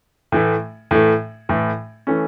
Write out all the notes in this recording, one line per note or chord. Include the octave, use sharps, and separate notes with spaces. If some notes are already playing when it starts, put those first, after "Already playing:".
A2 E3 A3
A2 E3 A3
A2 E3 A3
E3 A3 C#4